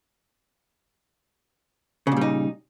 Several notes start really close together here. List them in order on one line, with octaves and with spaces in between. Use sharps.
C#3 A#2 G3 D#4